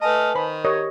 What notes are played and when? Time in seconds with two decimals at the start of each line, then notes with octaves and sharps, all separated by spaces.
0.02 A3 B4 D#5 G#5 A5 F6
0.35 D#3 C5 B5
0.65 G4 A#4 C#5 D#5